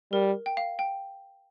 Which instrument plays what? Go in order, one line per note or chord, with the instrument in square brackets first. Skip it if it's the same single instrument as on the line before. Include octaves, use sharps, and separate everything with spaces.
[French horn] G3 [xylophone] A#4
[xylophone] G5
F5
G5